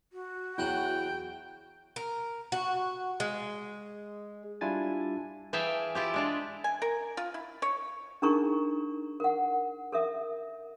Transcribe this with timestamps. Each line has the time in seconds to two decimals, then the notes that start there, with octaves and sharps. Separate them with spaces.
0.13 F#4
0.58 E2 F#3 E4 F#5 G5
1.96 A#4
2.52 F#4
3.20 G#3
4.61 G3 D4 E4 F4 G#5 A6
5.53 E3 G#4 E5 F5 G5 A5
5.95 E4 F4 G4
6.14 G#3 D4 F4
6.64 G#5
6.82 A#4
7.17 F4
7.34 E4
7.62 C#5
8.22 D4 D#4 G#4 A#4 A#5 C#6
9.20 A#4 F#5
9.92 A4 A#4 E5